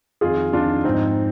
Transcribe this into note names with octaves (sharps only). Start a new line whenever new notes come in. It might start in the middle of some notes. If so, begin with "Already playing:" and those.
F2 D#3 F4 G#4
F2 D#3 D4 F4
G#2 F3 C4 D#4